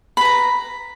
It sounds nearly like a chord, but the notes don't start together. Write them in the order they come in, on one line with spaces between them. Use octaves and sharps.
B5 B4 A#5